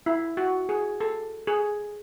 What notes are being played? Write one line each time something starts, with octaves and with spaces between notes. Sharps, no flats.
E4
F#4
G#4
A4
G#4